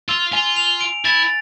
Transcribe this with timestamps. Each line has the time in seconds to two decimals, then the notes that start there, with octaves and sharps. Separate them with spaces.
0.09 F4 E6
0.32 F4 G#5
0.56 F7
0.81 D7
1.05 E4 A6